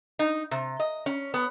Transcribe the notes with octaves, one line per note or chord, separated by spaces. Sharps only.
D#4
C3
D#5
C#4
B3